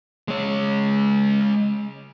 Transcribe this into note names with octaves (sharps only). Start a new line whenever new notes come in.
G#3 C#5